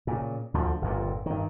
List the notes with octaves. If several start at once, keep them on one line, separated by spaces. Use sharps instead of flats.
A#2 C#3
D2 D3 F3
G1 F2 A#2
G2 D#3